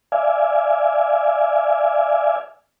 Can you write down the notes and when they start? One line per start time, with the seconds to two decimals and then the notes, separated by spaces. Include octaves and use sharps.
0.12 D5 E5 F5 G#5